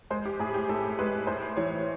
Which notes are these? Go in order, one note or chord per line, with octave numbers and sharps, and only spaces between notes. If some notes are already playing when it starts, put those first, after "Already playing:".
G#3 C5
G4
A2 G#4
G4
A2 A4
G#3 B4
A2 C5
E3 C#5